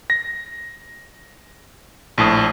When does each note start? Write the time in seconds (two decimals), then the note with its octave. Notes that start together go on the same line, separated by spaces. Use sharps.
0.10 A#6
2.18 A#1 A2 A5 D#6